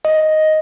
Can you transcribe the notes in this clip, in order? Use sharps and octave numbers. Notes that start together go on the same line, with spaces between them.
D#5